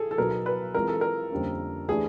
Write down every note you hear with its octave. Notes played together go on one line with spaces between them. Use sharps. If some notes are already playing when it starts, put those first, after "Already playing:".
Already playing: G#4 A4
A4
B2 F#3 B3 D#4 F#4 A#4
B4
E3 G#3 C4 F4 A#4
A4
A#4
F2 D3 G3 A#3 C#4
E3 A3 D4 G4 G#4